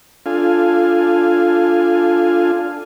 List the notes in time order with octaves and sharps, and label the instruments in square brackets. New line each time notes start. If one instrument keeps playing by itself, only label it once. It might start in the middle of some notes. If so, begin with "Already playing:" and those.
[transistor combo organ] D4 F4 A4 F5 G#5